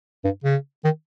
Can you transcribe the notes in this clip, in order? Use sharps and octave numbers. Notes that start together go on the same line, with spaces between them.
G2
C#3
D#3